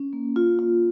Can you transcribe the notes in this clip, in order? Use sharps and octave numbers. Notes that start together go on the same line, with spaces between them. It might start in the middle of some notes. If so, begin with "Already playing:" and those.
Already playing: C#4
A#3
F4
F4